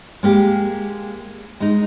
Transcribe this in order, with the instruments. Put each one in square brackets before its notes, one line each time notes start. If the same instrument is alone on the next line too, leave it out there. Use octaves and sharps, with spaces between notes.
[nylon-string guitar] G#3 A#3 G4
G#3 D#4